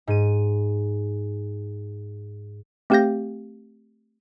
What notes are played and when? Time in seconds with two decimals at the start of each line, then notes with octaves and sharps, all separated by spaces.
0.07 G#2 D#7
2.90 A3 C4 G4 F5 G6 A#6